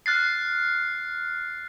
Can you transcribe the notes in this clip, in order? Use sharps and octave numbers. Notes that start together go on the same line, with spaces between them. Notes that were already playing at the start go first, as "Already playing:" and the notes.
F6 F#6 A6 C7